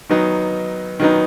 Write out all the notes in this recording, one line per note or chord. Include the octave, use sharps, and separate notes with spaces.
D#3 F#3 B3 D#4
D#3 F#3 B3 D#4